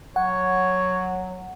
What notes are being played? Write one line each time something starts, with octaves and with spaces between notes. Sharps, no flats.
F#3 C#5 F#5